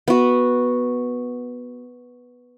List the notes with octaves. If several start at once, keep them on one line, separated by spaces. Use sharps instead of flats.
B3 F#4